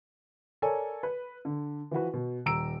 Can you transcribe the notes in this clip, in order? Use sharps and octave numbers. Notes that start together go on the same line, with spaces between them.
A4 A#4 C#5 D5 G#5
B4
D3
E3 F3 F#4 B4
B2
D#1 A#5 E6 D7